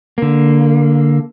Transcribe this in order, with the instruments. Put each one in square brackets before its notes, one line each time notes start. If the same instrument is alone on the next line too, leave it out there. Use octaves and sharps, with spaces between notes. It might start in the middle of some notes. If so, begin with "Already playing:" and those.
[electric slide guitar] D3 A#3